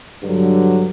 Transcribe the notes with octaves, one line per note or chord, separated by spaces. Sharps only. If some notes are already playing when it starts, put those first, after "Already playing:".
G2 D3 F#3